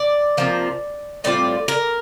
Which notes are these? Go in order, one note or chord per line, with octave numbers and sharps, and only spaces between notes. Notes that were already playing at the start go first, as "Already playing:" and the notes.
Already playing: D5
C3 F3 A#3
A2 G3 C4 F4 D5
A#4